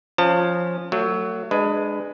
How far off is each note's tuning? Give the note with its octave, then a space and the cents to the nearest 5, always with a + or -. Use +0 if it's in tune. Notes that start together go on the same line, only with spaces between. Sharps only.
F3 +0 C#4 +0 A5 +35
F#3 +10 A3 +40
G#3 +0 D4 +30 B4 +20